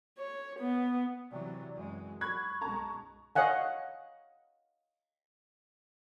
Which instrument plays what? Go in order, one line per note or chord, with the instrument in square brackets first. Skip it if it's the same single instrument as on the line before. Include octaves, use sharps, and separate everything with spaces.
[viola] C#5
B3
[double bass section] C3 E3 F#3 [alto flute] D5
[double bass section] F#2 E3 G#3
[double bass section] F#3 [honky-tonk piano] B5 F#6 G#6 [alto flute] C#6
[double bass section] B1 G#3 [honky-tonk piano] A5 A#5
[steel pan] C#5 D#5 F5 F#5 G#5